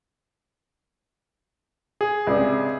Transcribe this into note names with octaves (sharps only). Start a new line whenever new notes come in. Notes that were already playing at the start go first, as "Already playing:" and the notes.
G#4
C#2 C3 D4